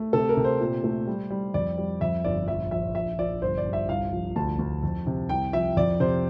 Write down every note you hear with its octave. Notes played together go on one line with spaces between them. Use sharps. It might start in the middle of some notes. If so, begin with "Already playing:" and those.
Already playing: A3
C3 A4
A#4
C3
C5
A#2
A3
G3
G3
F2 D5
G3
F2 E5
G1 D5
A#1 E5
A#1 E5
A#1 E5
A#1 D5
G1 C5
D5
G2
E5
C2 F5
F3
D2 A5
D2
F2
C3
C2 G5
F3 E5
F2 D5
C3 C5